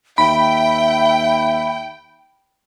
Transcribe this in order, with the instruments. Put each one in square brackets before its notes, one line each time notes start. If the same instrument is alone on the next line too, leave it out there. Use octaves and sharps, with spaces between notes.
[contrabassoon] D#2 [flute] E5 [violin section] G5 [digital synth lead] B5